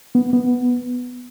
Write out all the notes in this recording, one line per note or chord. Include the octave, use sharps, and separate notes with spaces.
B3
B3